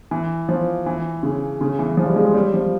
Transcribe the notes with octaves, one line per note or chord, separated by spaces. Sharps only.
E3
F3
E3
C#3
C#3
E3
F3
G3
G#3
G3
F3